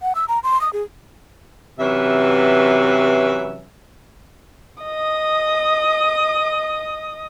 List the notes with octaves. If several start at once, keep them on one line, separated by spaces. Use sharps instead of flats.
F#5
E6
A#5
C6
D#6
G#4
C3 E3 F#3 C#4 B4 E5
D#5 D#6